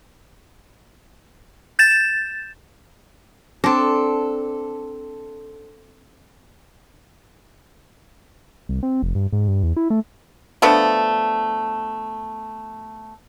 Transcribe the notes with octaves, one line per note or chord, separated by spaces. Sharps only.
G6 A6 E7
C4 D4 A4
C2
C4
F1
G2
G#2
G2
E2
E4
A3
F3 A3 B3 D4